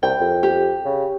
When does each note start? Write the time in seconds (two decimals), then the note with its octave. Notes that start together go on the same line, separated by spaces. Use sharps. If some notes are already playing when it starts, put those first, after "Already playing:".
0.03 C2 G5
0.20 F2
0.43 G4
0.85 C#3